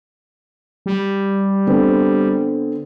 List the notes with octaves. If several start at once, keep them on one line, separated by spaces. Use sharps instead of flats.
G3
D3 B3 C4